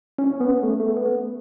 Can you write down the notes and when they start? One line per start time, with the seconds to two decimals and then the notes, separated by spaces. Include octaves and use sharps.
0.18 C#4
0.40 B3
0.63 A3
0.80 A3
0.97 B3